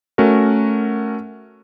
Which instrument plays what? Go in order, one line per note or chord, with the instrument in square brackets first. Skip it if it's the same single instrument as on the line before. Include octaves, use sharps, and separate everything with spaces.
[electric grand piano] A3 C#4 F#4 A#4